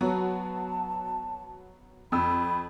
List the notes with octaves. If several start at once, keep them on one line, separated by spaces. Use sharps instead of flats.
F#3 B3 F#4 A5
F2 B5 E6